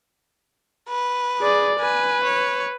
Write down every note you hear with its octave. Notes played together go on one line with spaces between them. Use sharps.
B4
G#4 D5
B4 G#5
C#5